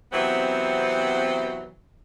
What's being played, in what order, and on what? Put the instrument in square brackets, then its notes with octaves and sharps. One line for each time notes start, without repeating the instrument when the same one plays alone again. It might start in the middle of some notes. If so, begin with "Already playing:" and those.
[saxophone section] C3 E3 F#3 B3 C4